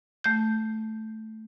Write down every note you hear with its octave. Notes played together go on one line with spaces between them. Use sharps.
A3 G6